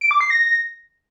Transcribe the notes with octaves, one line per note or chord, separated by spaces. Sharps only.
D7
D6
C7
A#6